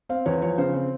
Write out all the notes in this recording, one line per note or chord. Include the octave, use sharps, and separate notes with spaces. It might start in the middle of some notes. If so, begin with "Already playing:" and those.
C4 F5
E2 C#5
F3 C#5
C#3 C5
C4